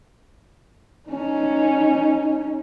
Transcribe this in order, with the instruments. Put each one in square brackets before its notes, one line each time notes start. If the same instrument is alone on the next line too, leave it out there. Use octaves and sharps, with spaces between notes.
[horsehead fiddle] C#4 D#4